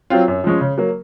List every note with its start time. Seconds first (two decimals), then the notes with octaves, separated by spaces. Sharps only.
0.10 F#3 C4 F4
0.28 F#2
0.44 F3 G#3 C#4
0.61 C#3
0.78 F#3 A#3